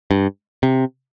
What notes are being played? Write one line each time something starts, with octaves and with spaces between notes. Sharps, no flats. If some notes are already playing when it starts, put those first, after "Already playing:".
G2
C3